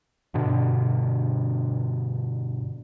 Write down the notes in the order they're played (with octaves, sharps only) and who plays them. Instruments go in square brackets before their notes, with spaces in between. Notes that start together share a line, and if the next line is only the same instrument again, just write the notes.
[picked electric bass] G2 B2 D3